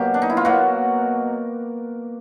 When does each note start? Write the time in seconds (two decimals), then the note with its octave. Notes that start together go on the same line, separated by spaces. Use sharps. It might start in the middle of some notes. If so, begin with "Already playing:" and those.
Already playing: B2 F#3 A#3 G4
0.14 D4
0.22 D#4
0.30 E4
0.37 F4
0.45 B2 F#3 A#3 F#4